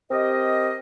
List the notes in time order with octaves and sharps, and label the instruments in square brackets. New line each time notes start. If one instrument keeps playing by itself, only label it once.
[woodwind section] C4 G4 A#4 D#5